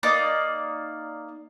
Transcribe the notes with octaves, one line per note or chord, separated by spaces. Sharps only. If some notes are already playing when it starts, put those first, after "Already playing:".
A#3 D#4 D5 D#6